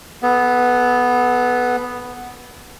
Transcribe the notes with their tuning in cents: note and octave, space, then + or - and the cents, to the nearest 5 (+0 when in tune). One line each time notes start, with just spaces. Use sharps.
B3 +0 A4 -35